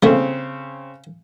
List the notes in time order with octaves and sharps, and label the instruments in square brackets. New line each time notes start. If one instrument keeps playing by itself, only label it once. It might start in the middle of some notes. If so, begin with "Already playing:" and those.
[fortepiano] C#3 C4 [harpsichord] G3 A3 A#3